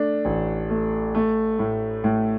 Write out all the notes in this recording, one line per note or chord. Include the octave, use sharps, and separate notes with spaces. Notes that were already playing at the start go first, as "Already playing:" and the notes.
Already playing: A3 D4
A1
A3
A3
A2
A2